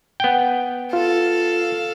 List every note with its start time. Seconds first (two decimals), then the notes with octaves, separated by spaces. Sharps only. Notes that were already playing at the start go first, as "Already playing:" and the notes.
0.20 B3 G5
0.93 F4 A4 F5